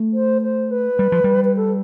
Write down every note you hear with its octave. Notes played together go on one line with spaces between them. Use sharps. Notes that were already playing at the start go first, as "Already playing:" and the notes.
Already playing: A3
C5
C5
B4
G3
F3
G3
B4
A4